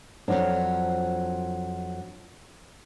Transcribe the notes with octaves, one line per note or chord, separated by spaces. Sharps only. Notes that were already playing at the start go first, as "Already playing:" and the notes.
F2 A#2 F3 F#3 D4